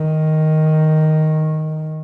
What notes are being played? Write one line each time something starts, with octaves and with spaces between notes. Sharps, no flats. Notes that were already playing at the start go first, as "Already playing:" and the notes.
Already playing: D#3